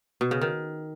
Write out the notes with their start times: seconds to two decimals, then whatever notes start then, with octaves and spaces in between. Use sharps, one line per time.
0.21 B2
0.31 C#3
0.41 D#3